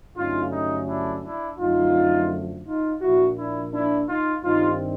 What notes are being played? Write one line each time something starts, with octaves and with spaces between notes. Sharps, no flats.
G2 D3 F#3 A3 C#4 D#4 F4
D#4
D4 E4
D4 E4
F#2 D3 F3 A3 D#4 F4
D#4 F4
A#2 F3 A#3 D4 E4 F#4
D4 E4
D4 E4
D#4 F4
G2 D#3 G3 C4 D#4 F4